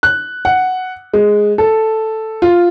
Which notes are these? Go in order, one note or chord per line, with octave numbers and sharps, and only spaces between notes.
F#6
F#5
G#3
A4
F4